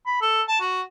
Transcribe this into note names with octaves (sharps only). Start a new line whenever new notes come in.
B5
A4
A5
F#4